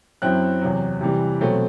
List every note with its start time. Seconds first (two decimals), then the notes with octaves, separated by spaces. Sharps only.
0.22 F#2 F#3 C4 E4 F#6
0.61 E2 C3 F#3
1.01 C3 E3 G3
1.41 B2 F#3 A3 C4